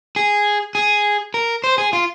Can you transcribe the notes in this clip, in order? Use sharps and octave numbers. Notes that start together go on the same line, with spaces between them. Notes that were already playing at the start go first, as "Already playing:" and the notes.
G#4
G#4
A#4
C5
G#4
F4